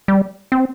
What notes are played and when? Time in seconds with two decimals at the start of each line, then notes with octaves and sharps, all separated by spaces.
0.08 G3
0.52 C4